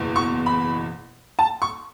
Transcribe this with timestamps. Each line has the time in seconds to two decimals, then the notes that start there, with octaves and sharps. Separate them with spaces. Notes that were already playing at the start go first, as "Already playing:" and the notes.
Already playing: F#1 E2 B2
0.16 C#6
0.46 B5
1.39 A5
1.62 C#6